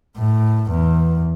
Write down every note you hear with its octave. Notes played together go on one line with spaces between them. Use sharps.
A2
E2